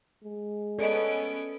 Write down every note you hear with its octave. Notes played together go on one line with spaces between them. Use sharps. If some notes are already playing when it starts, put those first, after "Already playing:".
G#3
B3 C#4 A4 D5 D#5 D7